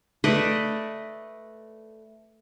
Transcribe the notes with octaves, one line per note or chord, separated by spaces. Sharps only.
A3 B4 D5 D#5